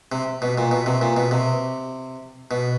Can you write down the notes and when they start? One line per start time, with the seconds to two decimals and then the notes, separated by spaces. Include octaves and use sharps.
0.12 C3
0.42 B2
0.58 A#2
0.71 B2
0.86 C3
1.01 A#2
1.17 B2
1.31 C3
2.51 B2